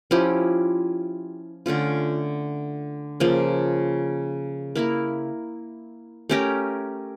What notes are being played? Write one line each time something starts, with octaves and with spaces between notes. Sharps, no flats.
F3 C#4 E4 G4
D3 A3 C#4 F4
C#3 F3 A#3
A#3 E4 A#4
A3 C#4 G4 A#4